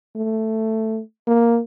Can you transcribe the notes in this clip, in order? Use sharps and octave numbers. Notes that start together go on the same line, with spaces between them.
A3
A#3